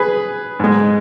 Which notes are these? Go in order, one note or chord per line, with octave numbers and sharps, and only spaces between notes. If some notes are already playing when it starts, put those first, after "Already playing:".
Already playing: G#4 B4
G#2 G#3